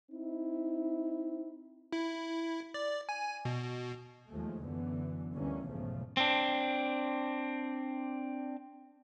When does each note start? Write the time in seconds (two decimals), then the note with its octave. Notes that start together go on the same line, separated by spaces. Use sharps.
0.11 C4 D#4 E4
1.93 E4
2.74 D5
3.09 G#5
3.45 B2
4.29 D#2 F3 G#3 A3
4.66 F#2 D3 E3 B3
5.34 D2 D3 E3 G3 A#3 C#4
5.68 B1 E2 G#2 C#3 F3 A3
6.17 C4 D4